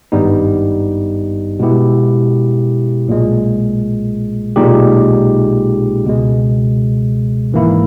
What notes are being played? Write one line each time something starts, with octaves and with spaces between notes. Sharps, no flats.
G#1 G2 G3 B3 D#4
B2 G#3 B3 E4 G4
B1 A#2 G#3
B1 A#2 G#3 D#4 G4
C#2 B2 G#3
G#1 G#2 E3 A#3 E4